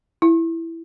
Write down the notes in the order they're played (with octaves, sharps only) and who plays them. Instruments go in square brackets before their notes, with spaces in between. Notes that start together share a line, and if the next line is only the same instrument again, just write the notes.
[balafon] E4